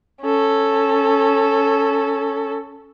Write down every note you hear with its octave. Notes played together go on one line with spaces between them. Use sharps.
C#4 A4